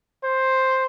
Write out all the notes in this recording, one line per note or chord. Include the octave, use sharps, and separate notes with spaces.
C5